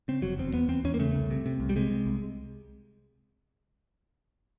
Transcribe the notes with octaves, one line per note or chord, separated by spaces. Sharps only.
C#3 C4
F1 F#3
E2 C4
E2 B3
E2 C4
E2 C#4
A#3
C#3 A3
C2
C3
C3
C2
G3
C3 G#3
C3
C2